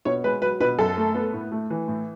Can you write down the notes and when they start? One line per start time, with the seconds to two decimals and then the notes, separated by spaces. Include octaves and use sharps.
0.05 B2 C#5
0.24 G#3 B4
0.42 F#3 B4
0.60 B2 B4
0.79 F#2 A4
0.97 A3
1.15 B3
1.33 A2
1.52 A3
1.70 E3
1.88 A2